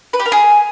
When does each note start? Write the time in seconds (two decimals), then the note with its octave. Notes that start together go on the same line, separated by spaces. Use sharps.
0.13 B4
0.19 G4
0.26 A#4
0.32 G#4